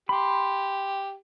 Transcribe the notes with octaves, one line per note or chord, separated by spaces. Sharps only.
G4 B5 C6